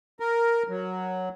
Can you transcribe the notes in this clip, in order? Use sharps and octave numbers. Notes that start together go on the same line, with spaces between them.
A#4
F#3